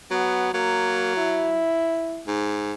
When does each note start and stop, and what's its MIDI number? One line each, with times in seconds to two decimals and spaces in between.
0.11 0.50 54
0.11 0.50 59
0.54 1.64 54
0.54 1.17 58
1.17 2.24 64
2.27 2.73 44